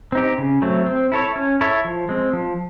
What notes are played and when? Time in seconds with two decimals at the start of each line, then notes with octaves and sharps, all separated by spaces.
0.12 C4 D#4 G4
0.38 C#3
0.62 F#3 A3 C4
0.86 C4
1.12 E4 A4 C#5
1.36 C#4
1.61 E4 A4 C#5 E5
1.85 F3
2.09 G#3 C4
2.33 F3